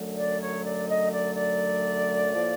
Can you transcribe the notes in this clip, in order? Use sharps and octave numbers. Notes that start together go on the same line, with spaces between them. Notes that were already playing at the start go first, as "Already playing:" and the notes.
Already playing: F#2 D3 F#3 A3
D5
C#5
D5
D#5
D5
D5
A2 F3 A#3